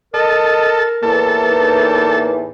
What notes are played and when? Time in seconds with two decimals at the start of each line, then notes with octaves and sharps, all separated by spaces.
0.14 A4 A#4 D#5
1.03 E2 A2 E3 A#3 A4
1.48 D#4